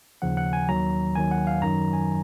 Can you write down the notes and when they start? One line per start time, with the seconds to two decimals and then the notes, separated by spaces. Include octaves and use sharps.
0.22 D#2 C#3 F3 F#5
0.37 F#5
0.53 G#5
0.69 D#2 D#3 F#3 A#5
1.15 D#2 D#3 F#3 G#5
1.31 F#5
1.47 F5
1.62 F#2 D#3 F#3 A#5
1.93 G#5